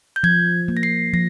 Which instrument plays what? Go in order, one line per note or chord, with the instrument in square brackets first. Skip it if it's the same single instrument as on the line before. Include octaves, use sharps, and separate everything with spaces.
[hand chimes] G6
[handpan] F3 [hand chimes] G#6
[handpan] A#3
[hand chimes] A#6
C7
[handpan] F3 [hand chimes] A#6